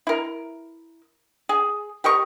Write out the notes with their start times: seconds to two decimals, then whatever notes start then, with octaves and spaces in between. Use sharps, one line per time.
0.07 E4 A#4
1.49 G#4
2.04 G4 A#4 D#5 C#6